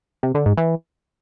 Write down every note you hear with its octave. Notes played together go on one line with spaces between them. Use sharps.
C3
D3
G#2
E3